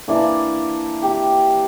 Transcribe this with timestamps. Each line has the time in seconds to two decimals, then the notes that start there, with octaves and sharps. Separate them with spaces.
0.08 E3 A#3 D4 D5
1.02 G4